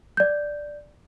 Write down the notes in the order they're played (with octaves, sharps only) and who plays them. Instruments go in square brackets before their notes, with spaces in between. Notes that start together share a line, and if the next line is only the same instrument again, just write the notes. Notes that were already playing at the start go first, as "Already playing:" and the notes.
[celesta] D5 G6